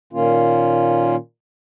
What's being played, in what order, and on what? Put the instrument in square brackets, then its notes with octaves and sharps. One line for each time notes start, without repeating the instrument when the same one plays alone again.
[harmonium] A#2 D#3 A#3 C#4 F4